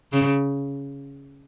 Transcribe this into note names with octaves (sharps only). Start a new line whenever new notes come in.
C#3